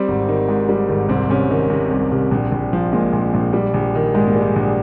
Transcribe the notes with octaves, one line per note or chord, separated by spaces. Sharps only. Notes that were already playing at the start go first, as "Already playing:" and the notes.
Already playing: G3 C4
G#1
D#3
G#2
G3
G#1
C2 C4
C2 C#4
D#3
C3
C2
C2
A#1
A#1
F3
A#2 G#3
A#1
A#1
G3
A#1
D#3
G#2 G#3
A#3
G3
G#3
A#1